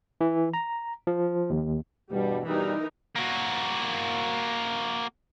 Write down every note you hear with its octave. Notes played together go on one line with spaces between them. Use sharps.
E3
A#5
F3
D#2
E2 G2 B2 G3
G2 B2 E3 G3 D#4 A#4
A#3 F#4